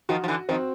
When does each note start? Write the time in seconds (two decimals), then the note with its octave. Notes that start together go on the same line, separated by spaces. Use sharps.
0.09 D#3 F3 F#4
0.24 F3
0.28 D3 E3
0.49 D#3 F3 C4